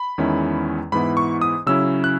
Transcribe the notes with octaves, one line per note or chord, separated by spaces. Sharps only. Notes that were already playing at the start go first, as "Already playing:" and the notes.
Already playing: B5
E2 D#3 G#3 C#4 E4
G#2 E3 B3 E4 B5
C#6
D#6
C#3 F#3 C#4 E4 E6
F#6